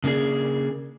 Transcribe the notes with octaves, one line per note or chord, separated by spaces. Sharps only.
C#3 A#3 D4 G#4